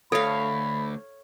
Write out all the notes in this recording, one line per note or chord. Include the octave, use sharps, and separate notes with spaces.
D2 A4 C#5 F5 B5